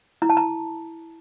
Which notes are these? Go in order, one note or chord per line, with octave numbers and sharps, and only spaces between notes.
E4 A#5
A5
A#5